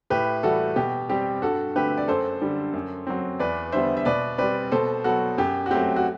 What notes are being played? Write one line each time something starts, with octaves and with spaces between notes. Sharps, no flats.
A2 G4 B4
E3 G3 F#4 A4
B2 G4
G3 C4 G4
G2 F#4 A4
D3 A3 C4 G4 B4
D5
F#2 A4 C5
D3 G3
F#2
F#3 C4
E2 B4 D5
D3 G3 B3 C5 E5
E5
B2 B4 D5
G3 C4 B4 D5
B2 A4 C5
F#3 B3 F#4 A4
F#2 G4
F#4
F#3 A3 C4 G4
F#4